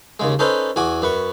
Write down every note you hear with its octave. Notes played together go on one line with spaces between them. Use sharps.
D#2 C#3 G#3
C#4 D#4 A4 B4 C5
E2 F#4 G#5 D6
F#2 B4 C#6